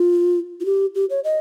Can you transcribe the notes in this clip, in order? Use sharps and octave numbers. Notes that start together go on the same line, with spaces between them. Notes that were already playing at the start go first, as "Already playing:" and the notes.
Already playing: F4
F4
G4
G4
C#5
D#5